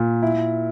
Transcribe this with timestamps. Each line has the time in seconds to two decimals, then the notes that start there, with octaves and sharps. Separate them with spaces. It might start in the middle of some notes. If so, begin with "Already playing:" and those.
Already playing: A#2
0.23 E4